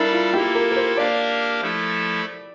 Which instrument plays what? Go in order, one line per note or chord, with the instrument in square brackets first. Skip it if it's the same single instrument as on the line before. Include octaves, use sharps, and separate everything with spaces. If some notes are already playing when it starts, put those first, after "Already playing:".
Already playing: [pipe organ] G3 D4 A4 D5 F5 [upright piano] E4 A#4
[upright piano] F4
[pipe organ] A#3 E4 A4 [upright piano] G4
[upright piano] A#4
A#4
C5
[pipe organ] A#3 D4 G4 A#4 F5 [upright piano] D5
[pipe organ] F3 A3 E4 A4